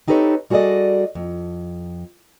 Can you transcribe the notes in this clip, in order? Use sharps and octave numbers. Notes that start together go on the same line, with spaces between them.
C4 D#4 G4 A4 B4 C#5
G3 F#4 G#4 A4 D5 D#5
F2